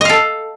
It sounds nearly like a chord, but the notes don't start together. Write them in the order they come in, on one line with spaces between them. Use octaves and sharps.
D#5 F5 A4